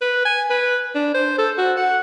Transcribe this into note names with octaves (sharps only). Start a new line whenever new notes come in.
B4
G#5
B4
D4
C5
A4
F#4
F#5